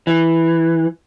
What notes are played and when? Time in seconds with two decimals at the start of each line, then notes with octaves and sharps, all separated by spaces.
0.07 E3